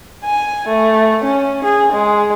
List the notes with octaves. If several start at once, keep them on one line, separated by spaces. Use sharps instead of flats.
G#5
A3
C#4
G#4
G#3